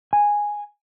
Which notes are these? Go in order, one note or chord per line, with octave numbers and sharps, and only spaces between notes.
G#5